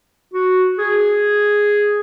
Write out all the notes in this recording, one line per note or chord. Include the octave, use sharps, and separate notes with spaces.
F#4
G#4